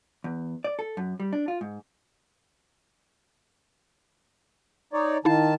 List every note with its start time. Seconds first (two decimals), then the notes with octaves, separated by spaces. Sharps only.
0.24 E2
0.64 D5
0.79 A4
0.97 F#2
1.20 G3
1.33 D4
1.48 F4
1.61 G#2
4.93 D#4 C#5 D5
5.25 D#3 D#4 E4 F5 A5